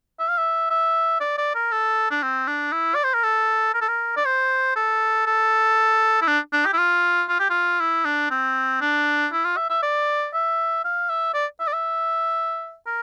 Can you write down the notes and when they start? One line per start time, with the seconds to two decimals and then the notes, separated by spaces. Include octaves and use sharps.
0.19 E5
0.28 F5
0.38 E5
0.70 E5
1.21 D5
1.38 D5
1.55 A#4
1.72 A4
2.11 D4
2.23 C4
2.47 D4
2.72 E4
2.95 D5
3.04 C5
3.14 A#4
3.23 A4
3.74 A#4
3.81 A4
3.88 A#4
4.17 D5
4.25 C5
4.76 A4
5.26 A4
6.22 E4
6.27 D4
6.53 D4
6.66 G4
6.73 E4
6.78 F4
7.29 F4
7.40 G4
7.50 F4
7.80 E4
8.05 D4
8.31 C4
8.81 D4
9.32 E4
9.45 F4
9.57 E5
9.70 E5
9.83 D5
10.34 E5
10.84 F5
11.09 E5
11.34 D5
11.60 E5
11.67 D5
11.73 E5
12.86 A#4